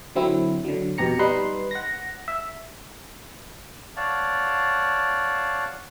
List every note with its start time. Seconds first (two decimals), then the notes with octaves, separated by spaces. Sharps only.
0.16 D3 F#3 C4 E4
0.64 D3 F#3
0.98 F2 B2 G4 A#5 C#7
1.19 G3 D#4 B4 C6
1.71 F#5 A#6
2.28 E5
3.96 C#5 D5 F5 F#5 A5